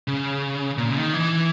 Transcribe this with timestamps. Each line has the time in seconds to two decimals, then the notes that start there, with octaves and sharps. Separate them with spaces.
0.08 C#3
0.78 A#2
0.91 C#3
0.97 D#3
1.14 E3